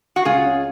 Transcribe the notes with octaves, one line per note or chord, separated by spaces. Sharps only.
F#4
C#2 F4 G#4
C#4